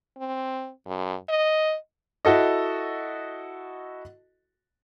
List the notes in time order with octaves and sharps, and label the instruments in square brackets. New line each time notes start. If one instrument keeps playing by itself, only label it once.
[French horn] C4
F#2
D#5
[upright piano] E4 F#4 A4 D#5